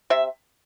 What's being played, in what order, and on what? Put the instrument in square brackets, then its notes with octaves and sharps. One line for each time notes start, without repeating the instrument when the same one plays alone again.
[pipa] C3 E5